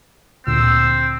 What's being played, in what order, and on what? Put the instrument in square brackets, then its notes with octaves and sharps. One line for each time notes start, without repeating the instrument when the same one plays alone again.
[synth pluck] D2 A#2 D3 [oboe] C4 [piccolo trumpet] E6